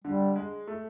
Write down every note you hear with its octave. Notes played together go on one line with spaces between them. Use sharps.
D3 G3
G#3
A3